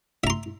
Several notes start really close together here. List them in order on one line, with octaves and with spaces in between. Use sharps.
E5 A#5 C6